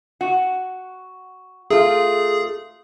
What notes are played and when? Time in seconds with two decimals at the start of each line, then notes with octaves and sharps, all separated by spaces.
0.21 F#4
1.71 A3 F4 G#4